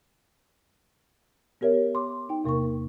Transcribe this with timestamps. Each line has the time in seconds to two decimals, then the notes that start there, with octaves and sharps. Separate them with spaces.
1.61 B3 G4 A#4 C#5 E5
1.95 C6 D6
2.29 D#4 G5
2.44 E2 C3 A#3 A#4 C#6